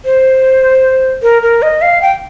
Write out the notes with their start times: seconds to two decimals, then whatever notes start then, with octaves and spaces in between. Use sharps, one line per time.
0.05 C5
1.22 A#4
1.43 A#4
1.62 D#5
1.82 F5
2.02 G5